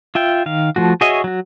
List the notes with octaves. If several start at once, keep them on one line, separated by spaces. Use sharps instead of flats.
F4 E5 G5
D#3 F5
F3 A3 F#4
F#4 G#4 C#5 D#5 E5
F#3 F#4